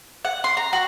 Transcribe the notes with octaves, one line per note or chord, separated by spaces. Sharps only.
F#5
C6
A#5
F#4